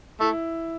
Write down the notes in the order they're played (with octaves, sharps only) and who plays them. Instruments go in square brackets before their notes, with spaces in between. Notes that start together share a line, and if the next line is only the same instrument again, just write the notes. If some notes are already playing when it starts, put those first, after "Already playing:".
[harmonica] A3 [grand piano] E4